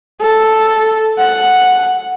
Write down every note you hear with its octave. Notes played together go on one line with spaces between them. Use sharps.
A4
F#5